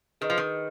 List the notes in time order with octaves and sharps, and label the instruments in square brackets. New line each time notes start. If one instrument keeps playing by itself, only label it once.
[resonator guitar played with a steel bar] D#3 [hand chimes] G#4 B4 D#5
[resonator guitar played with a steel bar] F3
D#3